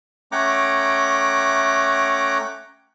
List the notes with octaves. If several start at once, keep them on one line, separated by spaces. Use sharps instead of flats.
A3 C#4 F#5 G5 A#5 D6